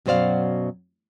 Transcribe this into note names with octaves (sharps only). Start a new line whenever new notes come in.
F#2 B2 F#3 C5 D5 F5